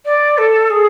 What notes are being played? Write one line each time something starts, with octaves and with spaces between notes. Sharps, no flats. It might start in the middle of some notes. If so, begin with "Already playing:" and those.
D5
A4
G#4